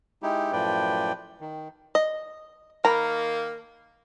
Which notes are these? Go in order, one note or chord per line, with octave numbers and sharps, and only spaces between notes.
G#3 D#4 E4 G4
F#2 A2 F3 B4 D5 G5
D#3
D#5
D#3 A#3 A#4 A#5 B5